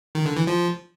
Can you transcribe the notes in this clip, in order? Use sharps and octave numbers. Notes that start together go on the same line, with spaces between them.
D#3
D3
E3
F3